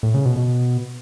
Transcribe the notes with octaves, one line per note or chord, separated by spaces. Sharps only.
A2
C#3
B2
B2